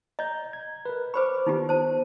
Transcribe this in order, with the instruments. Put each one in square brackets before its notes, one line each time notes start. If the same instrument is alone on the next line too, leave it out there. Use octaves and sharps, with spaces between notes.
[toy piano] D#5 [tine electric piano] A#5 G6
[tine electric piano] G#6
A#4 B4
[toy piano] B4 C5 B5 [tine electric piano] C#6 D6
[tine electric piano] D#3 B3 [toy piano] D#4 F4 G4
[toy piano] C5 A5